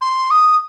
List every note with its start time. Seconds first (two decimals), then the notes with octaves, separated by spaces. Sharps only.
0.01 C6
0.31 D#6